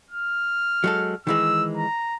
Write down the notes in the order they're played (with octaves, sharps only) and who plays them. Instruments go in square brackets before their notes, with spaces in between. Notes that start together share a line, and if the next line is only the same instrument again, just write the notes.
[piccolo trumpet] F6
[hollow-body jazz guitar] F#3 G#3 A4
[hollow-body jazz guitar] D#3 E3 G#3 [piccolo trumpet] E6
[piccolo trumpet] A#5